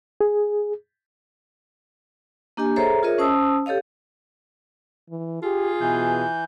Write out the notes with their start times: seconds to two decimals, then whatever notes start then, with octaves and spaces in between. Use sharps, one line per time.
0.21 G#4
2.57 A#3 D4 G4 D#5 G#5
2.76 G#4 A4 C5 C#5 E5 A#5
3.03 F4 G#4 A#4 C#5 D#5 E5
3.18 C#4 C5 A5 D#6 E6
3.66 G4 A4 C#5 D#5 F5
5.10 E3
5.43 F4 G4 G#4
5.81 B2 E3 G6